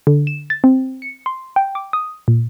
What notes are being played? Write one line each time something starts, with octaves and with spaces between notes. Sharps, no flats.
D3
E7
A6
C4
C#7
C6
G5
D6
D#6
A#2